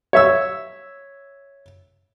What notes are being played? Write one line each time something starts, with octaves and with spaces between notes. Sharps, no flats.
C#5 E5 E6